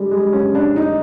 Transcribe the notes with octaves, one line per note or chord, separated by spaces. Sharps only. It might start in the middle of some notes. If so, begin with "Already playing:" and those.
Already playing: G3 G#3
G#3
C#4
D4
D#4